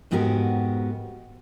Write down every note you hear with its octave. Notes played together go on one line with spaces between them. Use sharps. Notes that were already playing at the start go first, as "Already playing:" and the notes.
F2 G#2 B3 F#4 G4 A#4